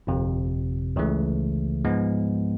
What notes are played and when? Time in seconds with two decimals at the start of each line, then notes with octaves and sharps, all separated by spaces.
0.07 G1 F2 C3
0.96 C#2 C#3 E3 A3
1.85 G#2 F3 G#3 B3